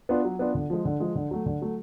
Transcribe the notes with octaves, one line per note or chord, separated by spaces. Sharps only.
B3 D4 F4
F#3
B3 D4 F4
D3
F3 G#3
D3
F3 G#3
D3
F#3 A3
D3
F#3 A3